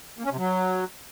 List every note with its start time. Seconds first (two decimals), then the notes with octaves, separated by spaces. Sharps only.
0.19 A#3
0.25 C#4
0.31 C3
0.38 F#3